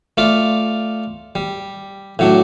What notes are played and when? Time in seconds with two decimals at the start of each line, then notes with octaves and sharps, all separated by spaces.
0.17 A3 F4 D5
1.35 G3
2.19 A2 F#3 D4